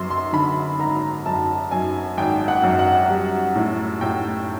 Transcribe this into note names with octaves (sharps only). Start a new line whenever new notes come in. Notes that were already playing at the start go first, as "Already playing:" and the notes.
Already playing: F#2 C6
C6
D3 B5
G#1 A#5
F#2 A5
F#2 G#5
G#1 G5
F#5
F#2
F#5
G3
A2
A2 G5